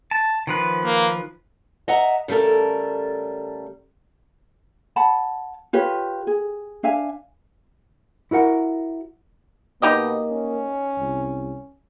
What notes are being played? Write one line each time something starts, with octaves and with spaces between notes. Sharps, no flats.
A5
D#3 F3 B4
A#3
D#5 E5 F#5 A#5
C#3 G3 A3 A4 A#4
F#5 A5 B5
F4 G4 B4 C#5
G#4
D4 E5 F5 G#5
E4 F#4 A#4 F#5
B2 A#3 D#4 G4 D#5
C#4
C2